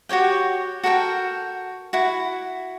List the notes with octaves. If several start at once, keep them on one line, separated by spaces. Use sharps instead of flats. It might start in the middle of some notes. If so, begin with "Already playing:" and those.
F#4 G4 C#5 G5
F#4 A4 A#4 G5
E4 F#4